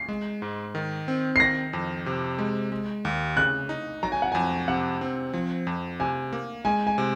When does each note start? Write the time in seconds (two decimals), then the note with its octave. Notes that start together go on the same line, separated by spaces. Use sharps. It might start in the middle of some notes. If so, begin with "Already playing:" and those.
Already playing: C7
0.09 G#3
0.42 G#2
0.75 D#3
1.08 C4
1.36 C7
1.40 D#3 A#6
1.73 F2
2.06 C3
2.39 G#3
2.72 G#3
3.05 D#2
3.36 C#3 F#6
3.69 D#4
4.03 F#3 A#5
4.12 G#5
4.22 F#5
4.32 F2 G#5
4.68 C3 F#5
5.01 C4
5.34 F3
5.67 F2
6.00 C3 G#5
6.33 A#3
6.65 G#3 G#5
6.87 G#5
6.98 C3